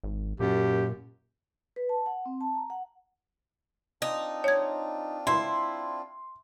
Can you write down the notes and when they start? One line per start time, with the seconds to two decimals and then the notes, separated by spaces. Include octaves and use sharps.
0.04 G#1
0.40 F#2 A#2 G4
1.76 B4
1.89 A5
2.06 F#5
2.26 C4
2.41 A5
2.55 A#5
2.70 F#5
4.02 C4 D4 D#4 F4
4.44 C#5 G#6
5.27 E4 C6